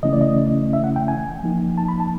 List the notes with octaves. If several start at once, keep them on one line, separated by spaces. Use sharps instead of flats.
C#3 E3 A3 C#4 E4 D#5
D5
D#5
E5
F#5
G5
G#5
F3 A#3 D#4
A5
B5
A5